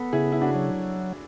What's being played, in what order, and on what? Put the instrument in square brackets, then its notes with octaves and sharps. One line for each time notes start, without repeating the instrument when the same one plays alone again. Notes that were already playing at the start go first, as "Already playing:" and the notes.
Already playing: [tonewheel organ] B3 [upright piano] A4
[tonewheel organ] C#3 [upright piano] E4 G#4
[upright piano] E4
D4 F#4
[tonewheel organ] F#3